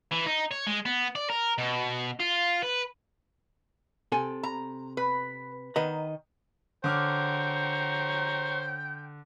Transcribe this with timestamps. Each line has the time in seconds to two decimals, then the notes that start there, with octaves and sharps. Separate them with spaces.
0.11 E3
0.26 D#4
0.51 C#5
0.67 G#3
0.86 B3
1.15 D5
1.30 A#4
1.58 B2
2.20 F4
2.63 B4
4.12 C3 A4 G#5
4.43 A#5
4.97 B4
5.76 D#3 B4 D#5 F#5 A#5
6.84 D3 C5 C#5 G5 A#5 D6 F6